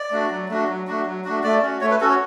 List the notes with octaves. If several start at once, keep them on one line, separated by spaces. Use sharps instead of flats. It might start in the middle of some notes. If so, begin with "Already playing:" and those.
Already playing: D5
A3 D4 F#4
F#3
A3 D4 F#4
F#3
A3 D4 F#4
F#3
A3 D4 F#4
A3 D5
C#4 F#4
A3 C#5
B4
C#4 F#4 A4
C#5